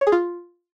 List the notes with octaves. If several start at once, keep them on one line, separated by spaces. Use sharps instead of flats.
C#5
G#4
F4